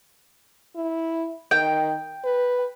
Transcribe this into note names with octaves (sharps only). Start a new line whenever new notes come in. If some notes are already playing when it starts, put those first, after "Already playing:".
E4
D#3 G5
B4